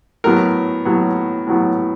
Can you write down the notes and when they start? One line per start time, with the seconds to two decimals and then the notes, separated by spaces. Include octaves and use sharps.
0.24 A2 F#3 B3 A#4
0.85 A2 F#3 B3
1.47 A2 F#3 B3